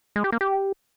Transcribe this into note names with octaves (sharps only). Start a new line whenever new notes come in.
G#3
G4
A#3
G4